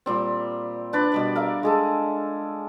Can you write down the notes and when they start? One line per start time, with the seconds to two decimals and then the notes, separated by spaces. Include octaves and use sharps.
0.06 A#2 G3 C4
0.93 D4 B4 D5
1.12 B2 G3 D5
1.35 A#4 E5 F5
1.63 G#3 G#4 A4